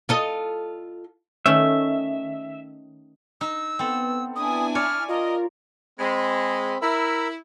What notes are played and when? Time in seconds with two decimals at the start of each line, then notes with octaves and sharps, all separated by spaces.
0.09 F4 A4 D#5
1.46 D#3 A3 C#4 E5
3.41 D#4 E6
3.79 B3 C4 A4
4.36 D4 E4 G#5 D#6
4.75 C#5 D5 F6
5.08 F4 A#4 D#5
5.99 G#3 C4 B5
6.82 E4 A#4 B5 E6